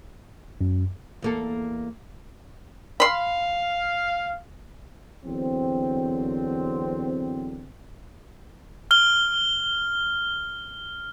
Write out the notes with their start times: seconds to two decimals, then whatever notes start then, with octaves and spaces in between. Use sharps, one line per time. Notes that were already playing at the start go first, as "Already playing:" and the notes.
0.61 F#2
1.22 E2 A#3 A4
3.00 F5 B5 C6
5.24 E2 D3 F#3 C4
8.91 F6 G7